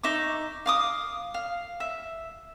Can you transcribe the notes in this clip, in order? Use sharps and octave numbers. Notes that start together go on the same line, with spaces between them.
D#4 E5 C#6 D6
F5 D6 D#6
F5
E5